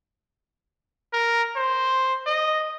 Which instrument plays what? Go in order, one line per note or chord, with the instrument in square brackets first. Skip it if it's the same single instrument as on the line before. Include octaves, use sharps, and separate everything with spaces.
[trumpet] A#4
C5
D#5